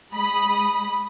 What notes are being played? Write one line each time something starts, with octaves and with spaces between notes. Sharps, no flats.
G#3 B5 D#6